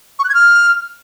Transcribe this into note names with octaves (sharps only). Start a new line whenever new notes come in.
C#6
F#6
G#6
F6